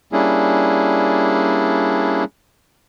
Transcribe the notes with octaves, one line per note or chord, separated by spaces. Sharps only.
G3 A#3 C#4 D4 E4 G#4